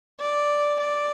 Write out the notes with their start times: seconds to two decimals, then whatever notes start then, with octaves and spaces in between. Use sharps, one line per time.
0.20 D5
0.81 D5